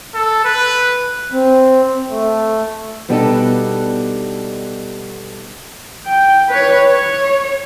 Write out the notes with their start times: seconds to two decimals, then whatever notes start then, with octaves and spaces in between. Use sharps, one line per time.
0.15 A4
0.45 B4
1.32 C4
2.09 A3
3.09 B2 G3 B3 D4 D#4 A4
6.06 G5
6.49 B4 C#5
6.86 C#5